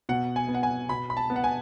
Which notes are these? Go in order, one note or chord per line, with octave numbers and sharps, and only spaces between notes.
B2 F#5
G#5
B3
F#5
G#5
B2 B5
B5
A5
B3
F#5
G#5